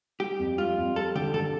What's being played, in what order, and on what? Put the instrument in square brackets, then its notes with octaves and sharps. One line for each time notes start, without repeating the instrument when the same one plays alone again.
[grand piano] G3 [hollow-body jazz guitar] G4
[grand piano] F2
[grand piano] G3 [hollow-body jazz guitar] F4
[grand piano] F2
[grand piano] G3 [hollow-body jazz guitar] A4
[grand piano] D3 [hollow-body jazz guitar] G4
[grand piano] D3 [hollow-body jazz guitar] A4